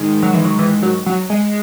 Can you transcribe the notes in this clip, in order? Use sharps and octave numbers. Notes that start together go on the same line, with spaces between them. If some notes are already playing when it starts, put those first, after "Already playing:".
Already playing: G#2 D#3 G#3
F#3
E3
F#3
E3
F#3
F#3
G#3